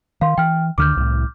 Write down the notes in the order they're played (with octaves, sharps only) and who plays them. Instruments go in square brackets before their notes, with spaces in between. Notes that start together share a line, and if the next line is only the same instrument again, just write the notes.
[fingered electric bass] D#3 [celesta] F5 C6
[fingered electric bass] E3 [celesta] G5 F6
[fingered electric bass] D2 D3 D#3 [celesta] D6 F6 G6
[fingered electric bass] C2 A2